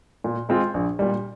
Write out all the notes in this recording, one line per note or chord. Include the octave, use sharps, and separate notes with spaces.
A#2
G#3 C4 F4
A#1
A#2 G3